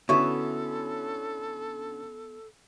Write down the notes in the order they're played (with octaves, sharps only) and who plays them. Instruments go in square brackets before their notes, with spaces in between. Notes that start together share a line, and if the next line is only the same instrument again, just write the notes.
[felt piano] D3 C#4 F#4 [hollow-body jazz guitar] B3 E4 E5 [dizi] A4 [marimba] C#6